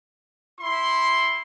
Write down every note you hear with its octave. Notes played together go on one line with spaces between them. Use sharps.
E4 C6